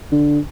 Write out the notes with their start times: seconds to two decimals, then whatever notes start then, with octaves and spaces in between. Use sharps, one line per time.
0.12 D3